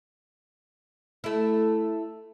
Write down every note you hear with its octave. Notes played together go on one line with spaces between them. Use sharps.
A3 E4